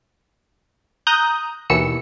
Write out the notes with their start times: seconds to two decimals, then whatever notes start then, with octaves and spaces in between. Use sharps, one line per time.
1.07 A#5 D#6 F#6 G6
1.70 D#2 B2 E3 E6 C#7